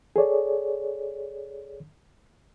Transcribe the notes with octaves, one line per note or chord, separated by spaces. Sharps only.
G#4 A4 C#5 D5